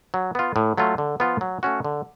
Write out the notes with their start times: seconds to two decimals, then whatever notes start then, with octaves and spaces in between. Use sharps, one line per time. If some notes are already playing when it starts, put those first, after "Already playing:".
0.14 F#3
0.35 B3 F4
0.56 A2
0.77 F#3 A3 F4
0.98 D3
1.20 F3 B3 F4
1.41 F#3
1.63 A3 C#4 F#4
1.84 D3